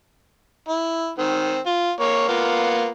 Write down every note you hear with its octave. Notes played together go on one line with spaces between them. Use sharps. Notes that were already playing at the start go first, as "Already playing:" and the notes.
E4
D#3 C4
F4
A#3 C#5
A#3 B3 F4